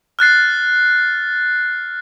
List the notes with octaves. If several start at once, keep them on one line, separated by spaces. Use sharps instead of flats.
F6 F#6 A6 C7